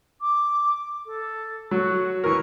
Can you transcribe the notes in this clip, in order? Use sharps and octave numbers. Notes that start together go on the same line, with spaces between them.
D6
A4
F#3 F#4
E3 A#4 C#6